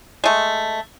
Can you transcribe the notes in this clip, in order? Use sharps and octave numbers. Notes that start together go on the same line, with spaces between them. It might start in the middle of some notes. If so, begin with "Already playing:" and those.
G#3 A3